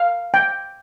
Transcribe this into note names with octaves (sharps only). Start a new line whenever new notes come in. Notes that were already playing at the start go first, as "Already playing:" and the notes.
Already playing: F5
G5